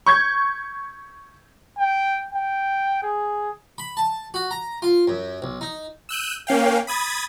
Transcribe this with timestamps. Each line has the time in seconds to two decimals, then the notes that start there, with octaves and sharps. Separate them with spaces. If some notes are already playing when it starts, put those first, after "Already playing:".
0.06 C#6 G6 G#6
1.78 G5
2.32 G5
3.02 G#4
3.78 B5
3.97 A5
4.34 F#4
4.51 A#5
4.82 F4
5.08 F#2
5.42 B1
5.61 D#4
6.09 E6 F#6 G6 D#7
6.47 A#3 C#4 F5 G5
6.87 B5 D#6 G#6 A6